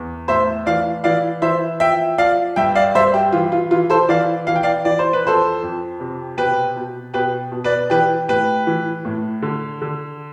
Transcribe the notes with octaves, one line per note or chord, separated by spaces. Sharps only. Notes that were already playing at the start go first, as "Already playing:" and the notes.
Already playing: E2
A2 C5 E5
E3 D5 F5
E3 D5 F5
E3 C5 E5
F3 E5 G5
F3 D5 F5
G2 E5 G5
D5 F5
G2 C5 E5
G4
E3 F4
F4
E3 F4
A4 C5
E3 D5 F5
E3 F5
G5
D5 F5
E3 D5
C5
B4
F2 A4 C5
F2
C3
B2 G4 B4
B2
B2 G4 B4
B2
B4 D5
E3 G4 B4
A2 G4 B4
E3
A2
D3
D3